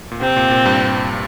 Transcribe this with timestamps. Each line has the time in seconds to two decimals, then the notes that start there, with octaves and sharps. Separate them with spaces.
0.11 A#2
0.21 C3 C4
0.36 A#2
0.51 A#2
0.65 G2